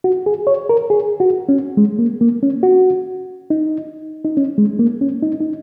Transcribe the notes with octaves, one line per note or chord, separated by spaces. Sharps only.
F#4
G#4
C#5
A#4
G#4
F#4
C#4
G#3
A#3
A#3
C#4
F#4
D#4
D#4
C#4
G#3
A#3
C#4
D#4
D#4